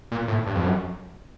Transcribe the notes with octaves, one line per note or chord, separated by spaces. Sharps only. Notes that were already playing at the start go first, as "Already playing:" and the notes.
A#2
A2
G2
F2
F#2